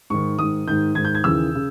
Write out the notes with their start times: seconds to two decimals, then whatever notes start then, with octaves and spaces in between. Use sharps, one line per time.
0.10 G#2 D#3 C#6
0.38 G#2 D#3 D#6
0.67 G#2 D#3 G6
0.95 G#2 D#3 G#6
1.05 G6
1.15 G#6
1.24 D#2 C#3 E3 E6
1.55 C#3